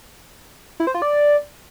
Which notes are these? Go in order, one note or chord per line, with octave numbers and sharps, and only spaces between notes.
E4
C5
F4
D5